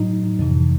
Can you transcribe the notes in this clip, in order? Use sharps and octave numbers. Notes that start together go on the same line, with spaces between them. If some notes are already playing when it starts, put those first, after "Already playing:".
Already playing: A2 F#3 D#4
F2 C3 E3